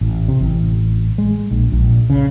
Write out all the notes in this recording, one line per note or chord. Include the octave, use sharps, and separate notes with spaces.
A1
C3
A1
G#3
A#1
A#1
C#3